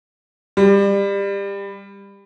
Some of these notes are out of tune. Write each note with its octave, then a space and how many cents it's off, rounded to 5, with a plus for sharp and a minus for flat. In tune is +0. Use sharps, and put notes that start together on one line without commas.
G3 +25